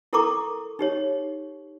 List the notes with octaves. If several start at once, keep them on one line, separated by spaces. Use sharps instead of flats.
E4 A4 A#4 A#5 C#6 D6
D#4 G4 C#5